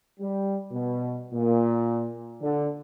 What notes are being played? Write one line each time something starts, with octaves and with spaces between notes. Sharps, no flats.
G3
B2
A#2
D3